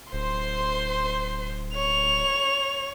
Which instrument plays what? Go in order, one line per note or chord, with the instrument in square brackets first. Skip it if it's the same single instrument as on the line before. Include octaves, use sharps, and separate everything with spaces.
[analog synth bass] D1 [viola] C5 [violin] C6
[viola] C#5 [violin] F7